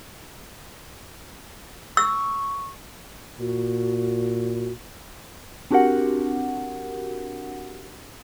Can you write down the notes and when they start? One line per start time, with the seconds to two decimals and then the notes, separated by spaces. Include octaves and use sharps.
1.97 C#6 E6
3.40 A#2 F#4
5.71 C4 D4 F#4 G4 A#4 F#5